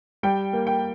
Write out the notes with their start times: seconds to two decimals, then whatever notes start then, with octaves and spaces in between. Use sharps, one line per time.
0.23 G3 G5
0.53 A#3
0.67 G5